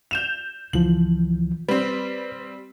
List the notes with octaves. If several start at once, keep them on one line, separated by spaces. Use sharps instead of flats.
G6 E7 F7
C#2 E3 F3 F#7
G3 C4 B4